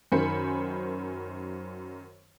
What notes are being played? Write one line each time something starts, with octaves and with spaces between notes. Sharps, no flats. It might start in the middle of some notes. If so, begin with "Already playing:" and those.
F#2 D#3 C5 G#5 B5 C#7